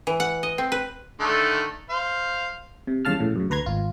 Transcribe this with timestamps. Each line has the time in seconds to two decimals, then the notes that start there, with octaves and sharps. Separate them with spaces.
0.07 E3
0.20 F#5
0.43 D#5
0.58 C4
0.72 B4
1.20 D3 D#3 A3
1.90 C5 F5
2.87 C3
3.05 E2 G2 C#3 F5 A5 F6
3.20 A#1 A2 C#3
3.36 F#2 C#3
3.50 D2 B4 A#5 C6 G#6
3.66 G#1 F4